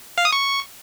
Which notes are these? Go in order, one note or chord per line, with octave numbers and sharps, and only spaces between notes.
F5
D#6
C#6